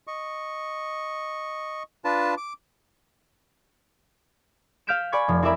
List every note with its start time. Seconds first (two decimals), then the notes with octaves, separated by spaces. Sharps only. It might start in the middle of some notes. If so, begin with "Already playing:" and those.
0.07 D#5 C#6
2.05 D4 F4 B4 A5
2.37 D6
4.87 F5 F6 G6 B6 D7 E7
5.12 D5 G#5 B5 C#6 G#6
5.28 F1 F3
5.43 C4 E4 A#4 D5 E5 B5